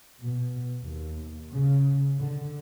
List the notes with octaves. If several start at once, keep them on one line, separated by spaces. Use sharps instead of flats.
B2
D#2
C#3
D3